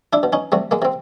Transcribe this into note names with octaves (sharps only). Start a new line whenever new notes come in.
D4 E4
B2
C#4 D#4
C3 G3 A3
G#3 A#3
C3 C4